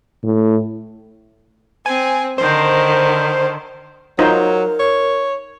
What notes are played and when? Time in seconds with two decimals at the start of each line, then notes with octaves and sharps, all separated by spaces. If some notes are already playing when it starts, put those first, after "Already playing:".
0.23 A2
1.86 C4 G#5
2.38 D3 D#3 C5
4.19 F#3 D#4 F4 A#4 C5
4.79 C#5